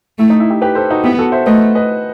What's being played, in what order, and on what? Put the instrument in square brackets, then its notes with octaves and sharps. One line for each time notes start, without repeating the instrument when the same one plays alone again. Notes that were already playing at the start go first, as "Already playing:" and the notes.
[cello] A3 [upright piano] E4
[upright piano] D#4
E4
E4 G4
G4 B4
A4 C5
D#4 F#4
[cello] B3 [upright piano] E4 G4
[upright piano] F#4 A4
C5 E5
[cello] A3 [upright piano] B4 D#5
[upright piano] B4 D#5